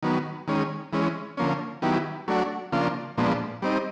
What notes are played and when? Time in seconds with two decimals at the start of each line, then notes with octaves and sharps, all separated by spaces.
0.03 D#3 F#3 B3
0.48 D#3 G#3 C#4
0.93 E3 G#3 C#4
1.37 D3 F3 A#3 C#4
1.82 D#3 F#3 B3 E4 G4
2.28 F#3 A3 D4 F#4
2.72 C#3 F3 A#3 D4 F4
3.17 A#2 F3 G#3 B3 D4
3.62 G3 C4 D#4